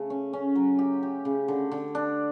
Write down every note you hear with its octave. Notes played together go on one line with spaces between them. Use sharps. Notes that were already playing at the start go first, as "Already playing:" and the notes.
Already playing: C#3 A3
C#4
C#4
F#3
G4
G4
C#3
D3
D3
D4